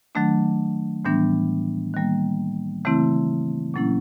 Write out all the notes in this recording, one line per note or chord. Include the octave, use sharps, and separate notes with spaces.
D#3 F#3 A3 D4
A2 E3 G3 B3 D4
D#3 G3 A#3
C#3 E3 A3 C4 E4
A#2 F#3 A#3 C#4 E4